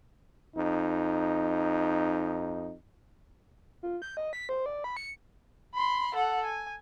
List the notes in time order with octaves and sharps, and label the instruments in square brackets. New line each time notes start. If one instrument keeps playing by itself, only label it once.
[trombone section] F2 D#4
[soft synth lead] F4
G6
D#5
B6
C5
D5
B5
C#7
[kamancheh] B5 C6
A4 F#5
G#5